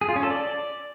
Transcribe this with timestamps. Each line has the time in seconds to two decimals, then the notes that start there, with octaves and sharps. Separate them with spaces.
0.01 G#4
0.09 F4
0.16 C#4
0.23 A4
0.30 D5